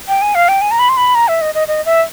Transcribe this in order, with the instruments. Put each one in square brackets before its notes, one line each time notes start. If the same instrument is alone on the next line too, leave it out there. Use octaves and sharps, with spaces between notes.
[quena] G5
G#5
F5
G5
G#5
A#5
B5
C6
B5
A#5
E5
D#5
D#5
D#5
E5